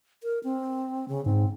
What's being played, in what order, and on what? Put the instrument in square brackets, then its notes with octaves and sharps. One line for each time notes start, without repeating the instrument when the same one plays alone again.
[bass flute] A#4
C4
C#3
[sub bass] G#2 [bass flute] C4